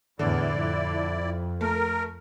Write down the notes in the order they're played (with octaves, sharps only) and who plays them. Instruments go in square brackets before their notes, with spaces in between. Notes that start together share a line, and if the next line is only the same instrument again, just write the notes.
[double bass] E2 A2 [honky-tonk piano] D3 [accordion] E4 D5
[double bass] F2
[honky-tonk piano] A3 [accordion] A#4